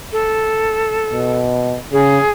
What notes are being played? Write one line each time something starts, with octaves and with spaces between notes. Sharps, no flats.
A4
B2
C#3 G#4